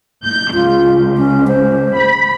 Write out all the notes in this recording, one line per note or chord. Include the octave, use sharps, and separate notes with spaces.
G6
C#2 F4
C#4
C5
B5